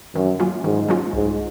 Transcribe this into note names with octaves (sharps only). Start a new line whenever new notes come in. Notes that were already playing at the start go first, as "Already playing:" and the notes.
F#2 D#3
F#3 A#3 C#4 F4
G#2 D#3
F#3 A#3 C#4 F4
C2 G#2